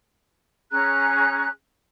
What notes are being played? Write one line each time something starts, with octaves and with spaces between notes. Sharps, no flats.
C#4 G#4 A#5 F#6